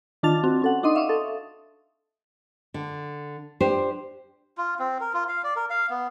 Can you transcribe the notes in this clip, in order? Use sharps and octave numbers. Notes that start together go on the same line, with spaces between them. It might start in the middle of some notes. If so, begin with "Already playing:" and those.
D#3 D4 F4 A5 A6 F7
C4 F#4
C#4 A4 F#5
D4 D#4 D#5 C6 D#6
E5 F5 C#6 D#6
A4
D3
D4 G4 C5
F4
C4
A#4
F4
F5
D5
A#4
F5
B3